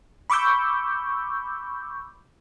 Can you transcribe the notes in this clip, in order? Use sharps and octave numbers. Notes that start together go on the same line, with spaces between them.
B5 C#6 D6 E6 G6